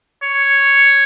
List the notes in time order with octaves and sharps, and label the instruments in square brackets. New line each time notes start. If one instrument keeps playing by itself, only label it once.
[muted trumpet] C#5